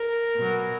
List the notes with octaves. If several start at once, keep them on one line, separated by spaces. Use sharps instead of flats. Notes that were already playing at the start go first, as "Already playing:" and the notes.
Already playing: A#4
B2 F#3